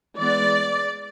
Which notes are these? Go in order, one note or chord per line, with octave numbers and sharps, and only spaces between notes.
E3 G#3 B3 D5